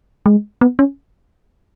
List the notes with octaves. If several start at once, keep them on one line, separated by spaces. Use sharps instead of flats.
G#3
B3
C#4